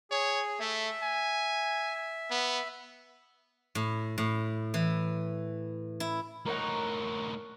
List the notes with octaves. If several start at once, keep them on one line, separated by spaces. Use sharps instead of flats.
G#4 C#5
A3 E5
G#5
B3
A2
A2
E3
E4
A2 D#4 A#4 C#5 F#5